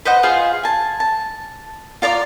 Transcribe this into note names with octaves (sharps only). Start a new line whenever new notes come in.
B4 C5 D#5 F#5
F4 G#4 C5 F5
G#5 A5
A5
F4 D5 A#5 D6